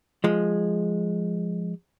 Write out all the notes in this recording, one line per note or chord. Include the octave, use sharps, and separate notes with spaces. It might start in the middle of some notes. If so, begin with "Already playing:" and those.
F3 G#3